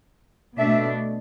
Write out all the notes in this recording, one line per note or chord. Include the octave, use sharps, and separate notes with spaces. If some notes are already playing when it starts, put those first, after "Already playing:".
B2 A3 D4 E5